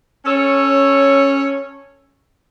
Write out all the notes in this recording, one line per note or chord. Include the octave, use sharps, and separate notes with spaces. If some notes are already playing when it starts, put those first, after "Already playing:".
C#4 A4 C#5